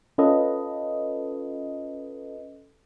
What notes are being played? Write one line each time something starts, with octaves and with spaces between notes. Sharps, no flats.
C#4 F4 A4 B4 D#5